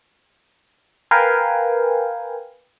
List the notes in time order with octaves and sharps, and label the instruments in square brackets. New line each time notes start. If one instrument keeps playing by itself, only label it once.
[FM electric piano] A#4 B4 F5 G5 G#5